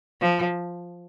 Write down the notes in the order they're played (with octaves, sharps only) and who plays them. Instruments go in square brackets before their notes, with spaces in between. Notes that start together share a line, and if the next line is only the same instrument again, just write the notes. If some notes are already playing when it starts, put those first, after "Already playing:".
[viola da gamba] F3